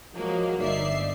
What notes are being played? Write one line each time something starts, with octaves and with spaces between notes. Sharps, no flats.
F3 F#3 G#3 A#3
G1 D#4 D5 E5 C7